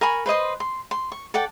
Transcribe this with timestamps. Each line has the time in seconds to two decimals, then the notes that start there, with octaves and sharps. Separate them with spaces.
0.01 A#4 G#5 B5 C#6
0.26 B4 C5 D#5 C6
0.60 C6
0.91 C6
1.12 C#6
1.34 A4 D5 F#5 G5